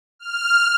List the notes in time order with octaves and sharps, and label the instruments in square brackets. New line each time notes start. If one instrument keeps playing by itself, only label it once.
[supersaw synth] F6